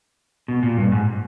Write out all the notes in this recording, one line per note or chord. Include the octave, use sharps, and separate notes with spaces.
B2
A#2
G2
G#2